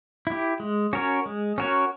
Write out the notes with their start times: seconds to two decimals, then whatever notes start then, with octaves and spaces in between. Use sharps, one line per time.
0.27 E4 G4
0.60 G#3
0.93 C#4 F#4 A#4 C#5
1.26 G#3
1.58 C#4 F#4 A#4 C#5